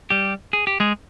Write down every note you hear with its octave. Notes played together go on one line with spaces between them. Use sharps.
G3 G4
G#4
G4
G#3 G#4